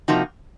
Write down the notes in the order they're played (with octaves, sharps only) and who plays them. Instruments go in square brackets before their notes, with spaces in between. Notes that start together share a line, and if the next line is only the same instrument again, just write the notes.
[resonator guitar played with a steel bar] C3 F3 A#3 D#4 F#4